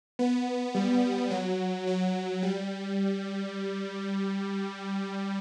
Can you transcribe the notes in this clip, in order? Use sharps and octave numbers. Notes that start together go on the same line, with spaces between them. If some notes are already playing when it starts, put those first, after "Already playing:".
B3
G3
F#3
F#3
G3